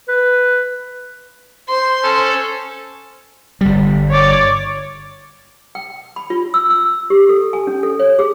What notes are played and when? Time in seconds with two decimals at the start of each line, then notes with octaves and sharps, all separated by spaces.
0.09 B4
1.69 C5 C6
2.03 C#4 A4
3.61 G1 G3
4.10 C#5 D5
5.75 G5
6.16 B5
6.30 F4
6.54 E6
6.70 E6
7.10 G4
7.29 A4
7.53 G#5
7.67 C#4
7.83 A4
7.99 C#5
8.19 G#4